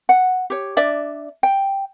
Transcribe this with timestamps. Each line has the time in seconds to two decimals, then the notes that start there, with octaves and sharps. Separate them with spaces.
0.09 F#5
0.50 G4 C#5
0.77 D4 D5 E5
1.43 G5